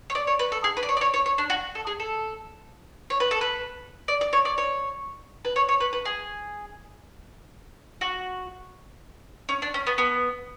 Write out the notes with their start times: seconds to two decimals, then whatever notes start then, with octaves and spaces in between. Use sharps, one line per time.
0.10 C#5
0.15 D5
0.27 C#5
0.39 B4
0.52 A4
0.64 G#4
0.77 B4
0.83 D5
0.89 C#5
0.97 D5
1.01 C#5
1.14 C#5
1.26 C#5
1.38 D4
1.50 F#4
1.75 A4
1.87 G#4
2.00 A4
3.10 C#5
3.20 B4
3.31 A4
3.41 B4
4.08 D5
4.21 D5
4.33 C#5
4.45 D5
4.58 C#5
5.45 B4
5.56 C#5
5.69 C#5
5.80 B4
5.93 B4
6.05 G#4
8.01 F#4
9.49 C#4
9.62 D4
9.74 C#4
9.87 B3
9.98 B3